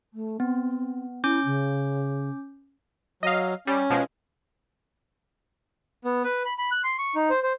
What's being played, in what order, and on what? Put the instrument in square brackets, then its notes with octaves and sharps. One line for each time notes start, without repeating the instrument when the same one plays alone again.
[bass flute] A3
[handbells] B3 [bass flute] C4
[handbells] C#4 D6 G6 [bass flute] E4
[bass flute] C#3
[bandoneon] F#3 [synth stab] D#5 F5
[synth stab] G3 [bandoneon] C#4
[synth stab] B2 F3 G#3
[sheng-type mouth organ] B3
B4
B5
B5
F#6
C6
C#6
D#4
C5
C5